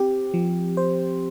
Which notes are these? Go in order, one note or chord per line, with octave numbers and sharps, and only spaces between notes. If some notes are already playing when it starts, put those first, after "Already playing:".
Already playing: C4 G4
F3
C5